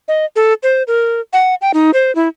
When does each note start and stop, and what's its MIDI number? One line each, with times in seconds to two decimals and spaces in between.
0.08 0.25 75
0.36 0.54 69
0.63 0.83 72
0.88 1.21 70
1.33 1.55 78
1.61 1.72 79
1.74 1.91 63
1.94 2.14 72
2.15 2.28 64